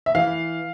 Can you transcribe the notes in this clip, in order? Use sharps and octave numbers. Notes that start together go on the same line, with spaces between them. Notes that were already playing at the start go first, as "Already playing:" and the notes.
E5
E3 F5